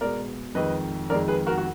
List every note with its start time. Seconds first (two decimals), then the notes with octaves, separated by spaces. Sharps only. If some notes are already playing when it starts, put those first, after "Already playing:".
0.01 B2 G#3 A#4 D5
0.55 F2 D#3 G#3 B4 D#5
1.10 F2 D#3 G#3 A#4 D5
1.28 G#4 B4
1.47 F#4 A#4
1.58 F#4